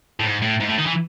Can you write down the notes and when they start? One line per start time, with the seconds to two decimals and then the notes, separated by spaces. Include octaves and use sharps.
0.20 A2
0.25 G#2
0.42 A2
0.60 G#2
0.68 A2
0.78 D#3
0.86 E3